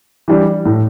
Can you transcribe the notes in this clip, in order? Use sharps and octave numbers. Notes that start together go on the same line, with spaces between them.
E3 G3 D4 G4
A2